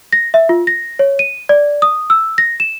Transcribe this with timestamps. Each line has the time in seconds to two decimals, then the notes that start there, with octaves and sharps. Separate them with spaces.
0.13 A#6
0.34 E5
0.49 F4
0.67 A#6
0.99 C#5
1.19 D#7
1.49 D5
1.82 D#6
2.10 E6
2.38 A#6
2.60 E7